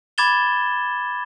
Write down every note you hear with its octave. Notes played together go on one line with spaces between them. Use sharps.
B5 D6 G#6 A6 E7 G7